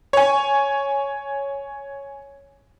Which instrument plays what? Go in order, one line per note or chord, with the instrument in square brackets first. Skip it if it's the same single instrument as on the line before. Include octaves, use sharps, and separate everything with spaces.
[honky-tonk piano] C#5 G#5